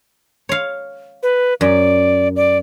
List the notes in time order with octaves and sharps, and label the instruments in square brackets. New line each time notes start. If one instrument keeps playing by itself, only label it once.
[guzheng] C#5 F5
[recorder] B4
[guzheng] F#2 [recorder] D5
[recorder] D5